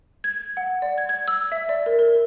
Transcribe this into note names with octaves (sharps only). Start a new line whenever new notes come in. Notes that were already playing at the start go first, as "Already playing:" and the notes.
G#6
F#5
D5
G#6
G#6
E6
E5
D5
A#4
A#4